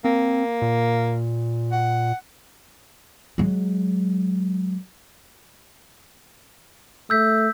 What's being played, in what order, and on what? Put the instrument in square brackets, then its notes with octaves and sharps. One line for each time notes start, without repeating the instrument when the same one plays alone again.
[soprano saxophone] A#3 [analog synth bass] C4
[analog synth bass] A#2
[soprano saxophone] F#5
[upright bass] F#3 G#3
[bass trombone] A3 [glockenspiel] E6 G6 B6